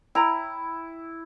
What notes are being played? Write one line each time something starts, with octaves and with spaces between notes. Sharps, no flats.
E4 G5 A#5